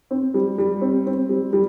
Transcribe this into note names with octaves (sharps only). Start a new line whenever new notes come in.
C4
G3
G3
C4
C4
G3
G3